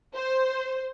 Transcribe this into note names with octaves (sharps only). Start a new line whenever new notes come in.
C5